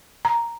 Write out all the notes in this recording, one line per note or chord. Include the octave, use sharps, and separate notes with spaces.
A#5